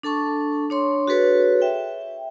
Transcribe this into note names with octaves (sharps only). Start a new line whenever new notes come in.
D4 A4 A5 C#6
D4 C#5 C6 C#6
F#4 G#4 A4 B4 C#5
E5 G5